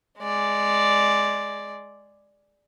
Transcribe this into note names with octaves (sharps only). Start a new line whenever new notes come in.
G#3 D5